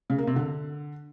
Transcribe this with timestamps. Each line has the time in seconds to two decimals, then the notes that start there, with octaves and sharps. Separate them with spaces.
0.10 C#3
0.18 A#3
0.27 C3
0.36 D3